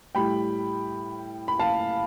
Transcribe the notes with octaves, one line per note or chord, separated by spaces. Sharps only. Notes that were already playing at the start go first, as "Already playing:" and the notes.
A2 G3 G5 B5
B5
F5 A5